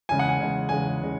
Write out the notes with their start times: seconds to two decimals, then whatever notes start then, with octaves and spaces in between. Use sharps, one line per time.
0.09 E2 C#3 G#3 G#5
0.19 F#5
0.29 G#5
0.39 E2 C#3 G#3
0.69 E2 C#3 G#3 G#5
1.01 C#3 G#3